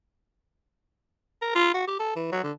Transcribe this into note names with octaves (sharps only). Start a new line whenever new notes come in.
A#4
F4
F#4
G4
A4
E3
F#3
D3